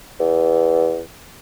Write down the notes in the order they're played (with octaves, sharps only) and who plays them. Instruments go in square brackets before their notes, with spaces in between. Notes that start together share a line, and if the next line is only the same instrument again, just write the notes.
[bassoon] E2